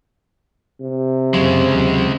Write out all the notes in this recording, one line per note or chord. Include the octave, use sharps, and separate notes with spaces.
C3
F#1 C#3 F#3 G#3
D#2 F#3